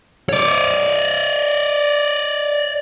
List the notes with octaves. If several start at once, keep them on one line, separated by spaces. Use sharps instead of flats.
C#5 D5